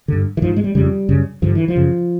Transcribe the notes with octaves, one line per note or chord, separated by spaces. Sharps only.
G2 D3
E3
G#2 F3
G#3
G3
F2 C#3 G3
F#2 C#3
G2 D3 F3
E3
F3
F#2 C#3